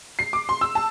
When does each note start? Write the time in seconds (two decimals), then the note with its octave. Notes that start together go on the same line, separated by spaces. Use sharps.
0.19 C7
0.33 D6
0.49 C6
0.61 E6
0.75 A5